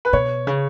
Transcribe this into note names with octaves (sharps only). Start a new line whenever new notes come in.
B4
B2 C#5
C#3